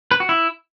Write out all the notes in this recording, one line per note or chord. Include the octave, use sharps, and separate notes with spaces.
B4
F#4
E4